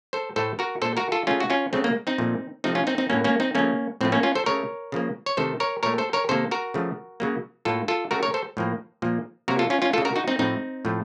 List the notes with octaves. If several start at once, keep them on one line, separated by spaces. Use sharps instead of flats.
A4 C5
A2 A3 A4 C5
F#4 A#4
A#2 A3 A4 C5
F#4 A#4
F4 A4
C#3 A3 C#4 F4
F#4
C#4 F4
C#3 F#3 A3 C4
A#3
C4 D#4
A#2 F3 A3
C3 F3 A3 C4 D#4
C#4 F4
C4 D#4
C4 D#4
A2 F#3 A#3 C#4
A#3 C#4
C4 D#4
C#3 F3 A3 A#3 C#4
A2 F3 A3 C4
A#3 C#4
C#4 F4
A4 C5
C#3 A3 A#4 C#5
C#3 F3 A#3
C#5
C3 D#3 A3 A4 C5
A#4 C#5
A#2 A3 A#4 C#5
A4 C5
A#4 C#5
C3 D#3 A#3 A4 C5
F#4 A#4
C#3 F3 A3
C#3 F#3 A#3
A2 F#3 A#3 F4 A4
F4 A4
C#3 A3 F#4 A#4
A#4 C#5
A4 C5
A2 F3 A#3
A#2 F3 A#3
C3 F#3 A#3 F#4 A#4
F4 A4
C#4 F4
C#4 F4
C#3 A3 F4 A4
F#4 A#4
D#4 F#4
C4 D#4
A2 F3 A3 C4 D#4
A2 F3 A3